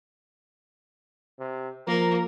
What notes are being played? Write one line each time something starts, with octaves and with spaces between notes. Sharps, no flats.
C3
F3 A#3 A#4